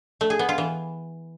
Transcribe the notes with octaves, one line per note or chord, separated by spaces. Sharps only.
A3
G#4
B3
F4
E3